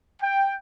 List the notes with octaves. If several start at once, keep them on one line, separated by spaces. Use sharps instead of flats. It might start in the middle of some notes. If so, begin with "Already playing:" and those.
G5